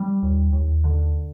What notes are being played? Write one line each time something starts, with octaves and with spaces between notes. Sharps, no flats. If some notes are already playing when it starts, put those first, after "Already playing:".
Already playing: G3
D#2
D#2
D3